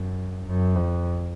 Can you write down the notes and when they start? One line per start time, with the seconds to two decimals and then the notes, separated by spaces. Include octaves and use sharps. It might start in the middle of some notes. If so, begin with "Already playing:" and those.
Already playing: F#2
0.47 F#2
0.76 F2